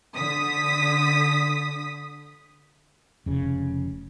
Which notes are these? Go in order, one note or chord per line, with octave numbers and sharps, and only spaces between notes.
D3 D#6 B6
F1 C#3